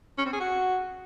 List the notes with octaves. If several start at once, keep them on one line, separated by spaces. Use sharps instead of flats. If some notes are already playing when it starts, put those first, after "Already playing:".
C#4
C4
G#4
F#4